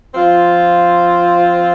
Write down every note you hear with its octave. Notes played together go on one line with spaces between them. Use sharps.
F3 C4 F4